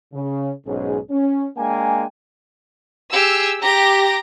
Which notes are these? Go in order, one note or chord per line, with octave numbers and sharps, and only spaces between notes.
C#3
B1 G#2 C#4 G#4
C#4
G#3 A#3 D4 G5 G#5
G4 G#4 E6
G4 A#5 A#6